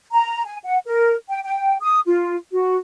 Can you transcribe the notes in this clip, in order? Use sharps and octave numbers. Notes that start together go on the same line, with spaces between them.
A#5
G#5
F#5
A#4
G5
G5
D#6
F4
F#4